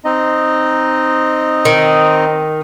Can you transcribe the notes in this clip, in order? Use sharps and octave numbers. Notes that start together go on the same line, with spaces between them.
C4 D#4 D#5
D#3